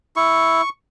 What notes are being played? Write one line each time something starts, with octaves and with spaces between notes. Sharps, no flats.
E4 C#6